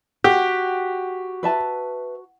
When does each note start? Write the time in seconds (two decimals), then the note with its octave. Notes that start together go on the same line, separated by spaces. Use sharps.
0.24 F#4 G4
1.43 B4 E5 A5